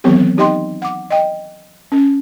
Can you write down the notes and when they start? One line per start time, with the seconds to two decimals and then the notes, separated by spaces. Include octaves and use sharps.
0.04 D#3 E3 F#3 B3 C4 G4
0.37 D#4 G4 D#5 G5 C6
0.82 F#5 D6
1.10 D#5 G5
1.92 C#4